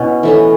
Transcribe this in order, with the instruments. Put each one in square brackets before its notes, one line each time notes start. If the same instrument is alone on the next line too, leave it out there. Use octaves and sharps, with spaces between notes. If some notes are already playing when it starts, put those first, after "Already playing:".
Already playing: [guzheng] B2 [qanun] C#4 E4
[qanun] E3 A3 C#4